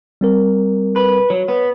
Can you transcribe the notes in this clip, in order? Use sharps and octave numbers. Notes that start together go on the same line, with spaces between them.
G3 C4 A#4
B4
F#3 C#5
B3